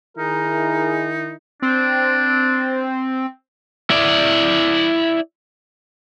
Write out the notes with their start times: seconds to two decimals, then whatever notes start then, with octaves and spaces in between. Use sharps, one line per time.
0.17 D#3 D#4 E4 G#4 A#4
1.62 C4 D4
3.90 E4 D5